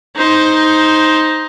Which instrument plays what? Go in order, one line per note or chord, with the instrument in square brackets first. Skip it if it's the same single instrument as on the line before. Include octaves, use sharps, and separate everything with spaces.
[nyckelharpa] D#4 C5